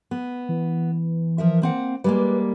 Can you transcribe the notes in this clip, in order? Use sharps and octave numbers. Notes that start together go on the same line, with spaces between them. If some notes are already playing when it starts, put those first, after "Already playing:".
B3
E3
F3 A#4 E5
A#3 C4 F#5
G3 G#3 A#3 B4